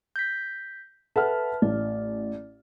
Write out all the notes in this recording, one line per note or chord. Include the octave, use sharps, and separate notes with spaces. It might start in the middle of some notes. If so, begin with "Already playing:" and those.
G6 A#6 B6
A4 B4 E5 F#5 A5 F6
A1 D5